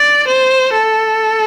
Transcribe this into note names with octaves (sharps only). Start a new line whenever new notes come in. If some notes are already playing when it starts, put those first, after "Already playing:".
Already playing: D5
C5
A4